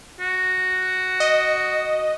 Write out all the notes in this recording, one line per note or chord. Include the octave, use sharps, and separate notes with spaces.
F#4
D#5